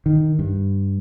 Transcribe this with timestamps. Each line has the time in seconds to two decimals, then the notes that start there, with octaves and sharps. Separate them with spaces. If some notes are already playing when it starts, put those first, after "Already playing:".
0.06 D#3
0.39 G2